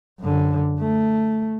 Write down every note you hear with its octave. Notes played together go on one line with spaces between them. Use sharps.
F#2 D3
A3